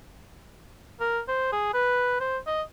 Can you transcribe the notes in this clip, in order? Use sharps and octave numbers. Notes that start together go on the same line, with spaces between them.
A#4
C5
G#4
B4
C5
D#5